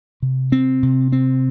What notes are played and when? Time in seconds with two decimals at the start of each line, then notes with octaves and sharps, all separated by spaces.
0.22 C3
0.52 C4
0.83 C3
1.12 C4